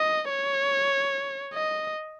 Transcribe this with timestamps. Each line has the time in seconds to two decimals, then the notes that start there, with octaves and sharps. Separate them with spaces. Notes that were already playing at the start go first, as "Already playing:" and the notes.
Already playing: D#5
0.30 C#5
1.53 D#5